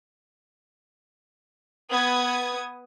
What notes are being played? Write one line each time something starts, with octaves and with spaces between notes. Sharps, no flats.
B3 D#6 G#6